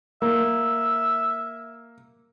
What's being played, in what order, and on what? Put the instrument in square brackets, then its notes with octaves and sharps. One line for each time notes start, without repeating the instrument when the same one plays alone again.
[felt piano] A#3 [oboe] E5